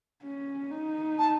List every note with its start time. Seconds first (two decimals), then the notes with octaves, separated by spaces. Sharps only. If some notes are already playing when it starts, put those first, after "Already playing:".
0.24 C#4
0.71 D#4
1.18 A5